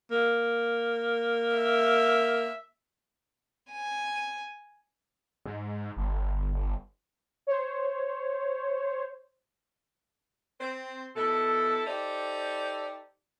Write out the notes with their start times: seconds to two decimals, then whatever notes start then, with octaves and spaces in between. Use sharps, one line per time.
0.11 A#3
1.57 E5
3.71 G#5
5.45 G#2
5.97 G1
7.47 C5 C#5
10.60 C4 C5
11.16 B2 E4 A4
11.86 D#4 G4 A4 C5 D5